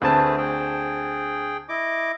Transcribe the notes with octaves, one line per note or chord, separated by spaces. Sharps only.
D2 A3 C4 G#4 B4 A5
G#4 G5
E4 D#5 D6